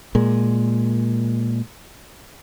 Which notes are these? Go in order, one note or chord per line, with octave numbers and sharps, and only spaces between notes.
A#2 G#3